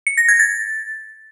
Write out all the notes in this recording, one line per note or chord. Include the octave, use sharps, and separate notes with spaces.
C#7
A#6
G#6
A6